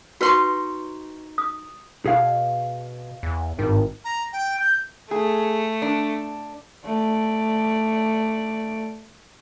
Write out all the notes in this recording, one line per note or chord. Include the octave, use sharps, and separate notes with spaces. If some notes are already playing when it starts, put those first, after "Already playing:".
D#4 F#4 B4 C6 C#6
D#6
B2 G#4 F5
E2
G#1 G2 D#3
A#5
G5
G6
A3 G#4
D4
A3 D5